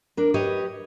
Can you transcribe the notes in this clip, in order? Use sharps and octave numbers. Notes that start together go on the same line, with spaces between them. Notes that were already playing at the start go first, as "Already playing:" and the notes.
D4 A#4
G4 B4 C#5 D#5